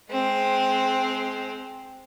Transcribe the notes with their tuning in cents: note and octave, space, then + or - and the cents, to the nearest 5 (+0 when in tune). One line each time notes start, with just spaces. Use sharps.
G#3 +25 C4 +0